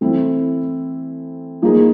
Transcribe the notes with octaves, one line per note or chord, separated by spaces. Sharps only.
E3 A3 C4 E4
F3 A#3 D#4 G#4